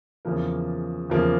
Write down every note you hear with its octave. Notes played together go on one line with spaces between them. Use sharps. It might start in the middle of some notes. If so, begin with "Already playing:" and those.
E2 C#3 F3 A#3
E2 C#3 F3 A#3